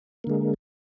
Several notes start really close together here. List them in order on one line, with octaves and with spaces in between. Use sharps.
A#3 D3 G#3